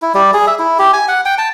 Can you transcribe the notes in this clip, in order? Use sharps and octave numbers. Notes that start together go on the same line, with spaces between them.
E4
G3
G#4
E5
E4
G4
G#5
F#5
G5
A5